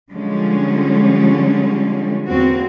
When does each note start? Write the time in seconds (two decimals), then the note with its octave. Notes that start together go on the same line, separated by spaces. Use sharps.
0.11 D3 F3 G3 G#3 C#4
2.27 E2 A#3 C4 F#4